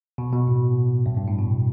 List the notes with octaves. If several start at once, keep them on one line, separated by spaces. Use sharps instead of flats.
B2
B2
A2
G2
G2
A2
B2